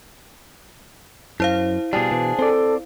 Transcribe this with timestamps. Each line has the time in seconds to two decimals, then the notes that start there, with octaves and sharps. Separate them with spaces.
1.40 F#2 E4 C5 F5
1.93 B2 G3 D4 G#4
2.11 B2 E3
2.39 C4 A4 D5